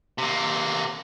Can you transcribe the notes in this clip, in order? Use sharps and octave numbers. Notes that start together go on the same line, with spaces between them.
C3 A#3